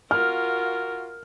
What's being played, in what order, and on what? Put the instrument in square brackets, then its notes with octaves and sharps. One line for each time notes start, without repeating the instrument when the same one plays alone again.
[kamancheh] F4 F#4 [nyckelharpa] A#4 [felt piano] F6